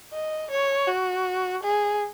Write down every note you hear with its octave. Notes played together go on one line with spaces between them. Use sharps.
D#5
C#5
F#4
G#4